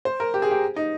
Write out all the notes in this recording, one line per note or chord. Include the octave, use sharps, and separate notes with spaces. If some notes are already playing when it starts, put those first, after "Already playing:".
C5
A#4
G4
G#4
G4
D#4